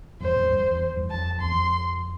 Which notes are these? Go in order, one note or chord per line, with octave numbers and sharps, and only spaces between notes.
E2 G2 C5
F2 A2
E2 G2
F2
E2
E2 G2
F2 A5
E2 C6
F2